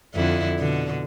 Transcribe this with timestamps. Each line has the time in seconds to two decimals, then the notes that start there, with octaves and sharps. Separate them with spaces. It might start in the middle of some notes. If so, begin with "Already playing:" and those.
0.14 F2 D3 E4
0.59 B2 D3